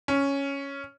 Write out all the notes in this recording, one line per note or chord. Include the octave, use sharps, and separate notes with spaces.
C#4